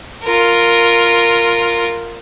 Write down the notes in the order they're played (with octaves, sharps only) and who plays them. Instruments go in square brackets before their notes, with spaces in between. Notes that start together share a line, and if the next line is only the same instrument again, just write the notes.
[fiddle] F4 A#4